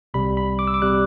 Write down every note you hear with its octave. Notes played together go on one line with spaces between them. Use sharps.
C2 C3 G3 B5
B5
D6
E6
D6
C3 G3 F#6